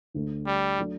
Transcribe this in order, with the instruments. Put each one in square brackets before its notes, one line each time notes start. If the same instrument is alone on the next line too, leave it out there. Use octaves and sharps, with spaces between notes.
[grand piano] D2 D3 A3
[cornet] G3
[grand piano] F#3 A3 D4